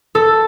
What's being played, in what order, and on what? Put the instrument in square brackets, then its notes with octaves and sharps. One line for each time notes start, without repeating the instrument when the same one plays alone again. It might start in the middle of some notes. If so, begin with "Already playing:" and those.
[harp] A4